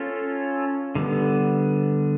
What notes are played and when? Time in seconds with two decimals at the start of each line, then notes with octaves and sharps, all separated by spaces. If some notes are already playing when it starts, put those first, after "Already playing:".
Already playing: C#4 F4 A4 C#5
0.95 D3 G3 B3